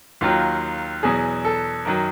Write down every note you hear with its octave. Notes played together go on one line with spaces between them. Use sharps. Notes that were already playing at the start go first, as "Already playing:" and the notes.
D#2 D#3 F#3 F4
E2 B2 F#3 G#4
A4
F#2 D#3 F#3 A#4